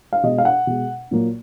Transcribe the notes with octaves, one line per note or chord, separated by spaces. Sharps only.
F5
B2 G#3 D#5
F5
F#5
B2 G#3
A#2 F#3 A#3